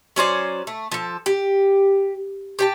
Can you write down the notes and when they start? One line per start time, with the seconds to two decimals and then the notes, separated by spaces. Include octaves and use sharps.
0.16 F#3 C#4 C5 D5
0.67 A3
0.92 F3 A4
1.26 G4
2.59 G4 G5 A5